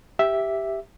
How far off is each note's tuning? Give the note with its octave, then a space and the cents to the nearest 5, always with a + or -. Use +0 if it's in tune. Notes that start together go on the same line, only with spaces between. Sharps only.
G4 +0 E5 +0